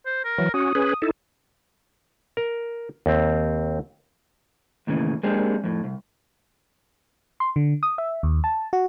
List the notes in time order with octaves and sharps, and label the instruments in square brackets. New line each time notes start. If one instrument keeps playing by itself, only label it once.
[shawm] C5
A#4
[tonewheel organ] E3 F#3
[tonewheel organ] C#4 F#4 [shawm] D#6
[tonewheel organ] C#4 G#4 B4
D#4 E4 A4
[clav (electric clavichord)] A#4
D#2 C4
[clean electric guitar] D#2 A2 C#3 E3
G#3 A#3 C4 D4 G4 G#4
F2 A2
C2
[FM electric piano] C6
D3
D#6
E5
D#2
A5
F#4